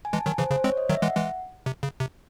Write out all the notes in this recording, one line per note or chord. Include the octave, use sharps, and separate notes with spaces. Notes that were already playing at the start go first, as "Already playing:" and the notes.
G#5
E3 G#3 A5
D#3 F#3 G#5
C#3 E3 C5
C#3 C5
G#3 C4 C#5
D#5
D#3 F#3 E5
E3 G#3 F#5
E3 G#3
C3
C#3
C3